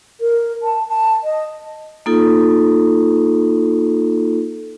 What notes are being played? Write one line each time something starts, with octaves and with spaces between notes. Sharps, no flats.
A#4
A5
A5
D#5
A#3 D#4 F4 A4